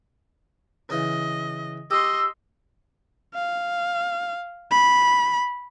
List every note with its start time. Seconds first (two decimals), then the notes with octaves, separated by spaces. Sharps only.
0.90 C#3 E3 D#5
1.91 G4 D#5 C6 E6
3.34 F5
4.71 B5